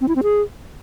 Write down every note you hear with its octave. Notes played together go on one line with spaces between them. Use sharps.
C4
E4
C4
G#4